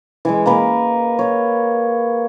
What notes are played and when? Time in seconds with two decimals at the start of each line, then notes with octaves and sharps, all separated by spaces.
0.25 E3 G#3
0.46 A#3 A#4 B4
1.19 C#5